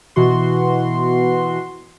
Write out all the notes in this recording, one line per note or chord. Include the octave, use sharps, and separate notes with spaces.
B2 E3 F#4 C6